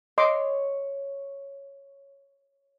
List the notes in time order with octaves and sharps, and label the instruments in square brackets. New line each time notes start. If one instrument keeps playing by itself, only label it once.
[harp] C#5 [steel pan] D#5 C6 D6